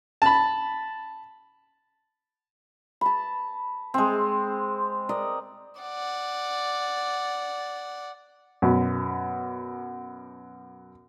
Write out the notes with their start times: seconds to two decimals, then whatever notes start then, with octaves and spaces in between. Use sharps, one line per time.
0.22 A5 B5
3.01 A5 B5
3.94 G#3 C4
5.09 A#4 D5 D#5
5.80 D5 F#5
8.62 F#2 B2